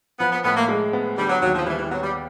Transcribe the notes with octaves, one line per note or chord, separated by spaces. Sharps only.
F3 B3
B3
A2 B3
A#3
G#3
B3
D3 G3
F#3
D#2 F#3
F3
E3 G3
E3
F#3 B3
G3